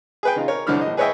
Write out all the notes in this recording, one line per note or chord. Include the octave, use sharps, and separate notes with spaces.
G#4 B4 G5
C#3 D#4 F4
A#4 C#5
C2 D3 F3 D4 B5 F6
A#1 D#5
G#4 B4 C#5 D#5 E5 G5